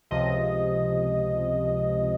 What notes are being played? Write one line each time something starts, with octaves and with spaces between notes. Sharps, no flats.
C#2 C3 F3 D#5